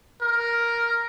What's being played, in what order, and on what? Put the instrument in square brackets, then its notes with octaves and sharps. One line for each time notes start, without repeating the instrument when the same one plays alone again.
[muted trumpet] A#4